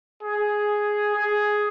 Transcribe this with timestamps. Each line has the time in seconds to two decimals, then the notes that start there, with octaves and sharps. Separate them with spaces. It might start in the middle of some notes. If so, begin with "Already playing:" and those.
0.23 G#4
1.16 G#4